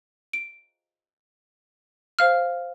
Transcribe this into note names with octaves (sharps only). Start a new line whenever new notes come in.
D7
C5 F5 F6